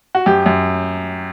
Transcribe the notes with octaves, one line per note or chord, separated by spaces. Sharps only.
F#4
F#2 G4
F#2